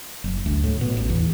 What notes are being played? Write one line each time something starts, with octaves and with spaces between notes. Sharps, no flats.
F#1
D2
A2
B2
A1
E2